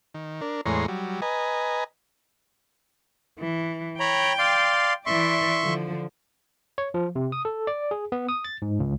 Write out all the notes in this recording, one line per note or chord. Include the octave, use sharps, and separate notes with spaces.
D#3
D4 A#4
E2 A2 G#3 C#5 A#5 C6
F#3 G3
B4 D#5 G#5 A#5
E3
C#5 G5 A#5 B5
D5 F5 C6
E3 D5 E5 C6 C#6
D3 F3
C#5
F3
C3
D#6
A4
D5
G#4
B3
D#6
A6
G#2
C#2